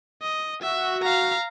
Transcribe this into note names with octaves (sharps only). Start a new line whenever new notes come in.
D#5
F#4 E5
F5 A#5